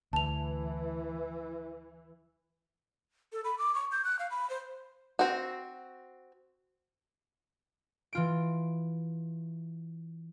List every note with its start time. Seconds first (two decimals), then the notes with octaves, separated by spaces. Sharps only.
0.13 D2 E3 A5 F7
3.33 A4
3.44 B5
3.58 D6
3.74 C#6
3.92 G6
4.04 F#6
4.19 F5
4.31 B5
4.50 C5
5.19 C4 F#4
8.13 E3 F4 D7